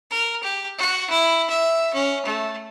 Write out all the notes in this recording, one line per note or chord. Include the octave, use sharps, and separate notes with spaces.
A#4
G4
F#4
E4
E5
C#4
A3